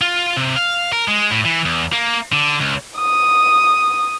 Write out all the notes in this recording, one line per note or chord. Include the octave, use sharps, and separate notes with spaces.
F4
C3
F5
A#4
G#3
A2
E3
E2
A#3
D3
C#2
D#6